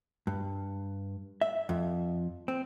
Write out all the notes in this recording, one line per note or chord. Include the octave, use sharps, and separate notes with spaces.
G2
E5
F2
C4